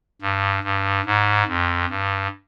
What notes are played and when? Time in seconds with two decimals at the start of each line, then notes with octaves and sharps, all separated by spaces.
0.21 G2
0.63 G2
1.06 G#2
1.48 F2
1.89 G2